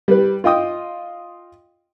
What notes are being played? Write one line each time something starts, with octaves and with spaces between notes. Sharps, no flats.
G3 B4
F4 D#5 G5 D#6